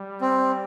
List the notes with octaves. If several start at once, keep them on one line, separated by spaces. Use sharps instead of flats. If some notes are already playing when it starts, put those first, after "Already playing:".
Already playing: G3
C4